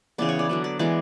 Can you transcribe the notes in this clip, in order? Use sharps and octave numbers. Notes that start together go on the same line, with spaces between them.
C#3 E3 B3 D5
C#5
D5
D3 F#3 B3
D5
E3 G#3 B3 D5